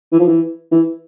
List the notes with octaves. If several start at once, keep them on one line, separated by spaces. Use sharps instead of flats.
E3
F3
E3
E3